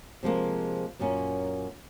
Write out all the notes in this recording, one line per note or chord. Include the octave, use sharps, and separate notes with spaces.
C3 F3 G#3 A#3
F#2 A#2 A#3 C#4